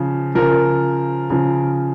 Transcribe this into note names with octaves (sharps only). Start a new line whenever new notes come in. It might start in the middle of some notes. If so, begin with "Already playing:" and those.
Already playing: C#3 F3
C#3 F3 A#4
C#3 F3